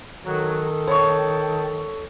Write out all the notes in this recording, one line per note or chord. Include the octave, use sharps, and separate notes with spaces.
D#3 F#3 A4
C#5 G5 A5 C#6